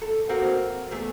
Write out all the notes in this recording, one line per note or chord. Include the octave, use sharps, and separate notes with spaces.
A4
A#3 C4 F#4
E2 A3 G#4